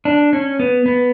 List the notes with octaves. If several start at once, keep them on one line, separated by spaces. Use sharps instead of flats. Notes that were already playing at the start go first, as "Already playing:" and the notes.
D4
C#4
B3
B3